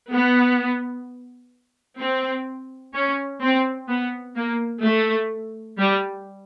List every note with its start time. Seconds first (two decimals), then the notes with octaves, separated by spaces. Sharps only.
0.11 B3
1.99 C4
2.95 C#4
3.42 C4
3.89 B3
4.36 A#3
4.84 A3
5.78 G3